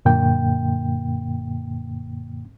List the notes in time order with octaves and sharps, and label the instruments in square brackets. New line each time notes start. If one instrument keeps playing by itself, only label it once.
[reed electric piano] F#2 A#2 D3 A#3 G5